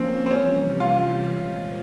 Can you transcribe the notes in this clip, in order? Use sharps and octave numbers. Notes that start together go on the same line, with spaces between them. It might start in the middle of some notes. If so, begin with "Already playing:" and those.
Already playing: F3 A#3 C4 C#4
C4
C3 E3 G3 C#4
F4
A#2 F3 G#3